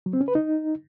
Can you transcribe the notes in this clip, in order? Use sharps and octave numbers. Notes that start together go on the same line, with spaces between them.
F#3
C4
C#4
B4
D#4